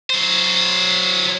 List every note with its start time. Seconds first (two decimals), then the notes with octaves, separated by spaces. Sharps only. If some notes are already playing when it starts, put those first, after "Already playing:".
0.10 F#3 C5